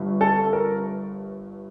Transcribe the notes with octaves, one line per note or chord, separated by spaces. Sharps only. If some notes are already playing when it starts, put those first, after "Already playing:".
Already playing: G1 G2
A4
A#4